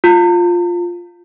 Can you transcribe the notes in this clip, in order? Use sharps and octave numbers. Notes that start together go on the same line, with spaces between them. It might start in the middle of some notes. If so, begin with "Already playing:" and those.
F4